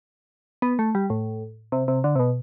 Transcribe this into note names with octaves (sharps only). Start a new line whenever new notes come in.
B3
A3
G3
A2
C3
C3
D3
C3
B2